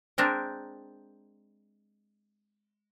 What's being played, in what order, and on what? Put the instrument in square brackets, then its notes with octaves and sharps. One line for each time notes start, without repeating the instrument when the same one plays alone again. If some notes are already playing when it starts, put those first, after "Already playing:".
[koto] G#3 C4 D4 A#4